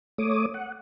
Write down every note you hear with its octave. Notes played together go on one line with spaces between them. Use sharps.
A3 C#5 D6 D#6
F#5